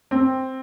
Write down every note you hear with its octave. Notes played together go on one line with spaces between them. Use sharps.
C4